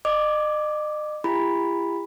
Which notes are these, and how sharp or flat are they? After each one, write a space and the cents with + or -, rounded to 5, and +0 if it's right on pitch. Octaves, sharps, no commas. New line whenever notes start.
D#5 -40 D6 +0
E4 +45 G4 +45 B5 +0